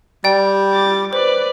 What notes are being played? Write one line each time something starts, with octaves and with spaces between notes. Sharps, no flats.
G3 D5 G5
D6 A6
B4 C5 D5